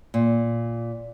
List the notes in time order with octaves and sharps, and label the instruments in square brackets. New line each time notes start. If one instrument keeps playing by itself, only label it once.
[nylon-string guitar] A#2